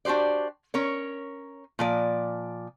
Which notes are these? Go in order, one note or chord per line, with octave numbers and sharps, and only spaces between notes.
D4 F#4 G4 C5 D5
C#4 A#4 C#5
A#2 F3 D5